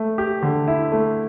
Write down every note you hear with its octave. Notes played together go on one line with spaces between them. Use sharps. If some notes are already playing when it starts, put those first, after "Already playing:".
Already playing: A3
G4
D3
E4
A3